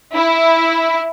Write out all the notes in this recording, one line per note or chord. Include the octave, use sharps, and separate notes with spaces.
E4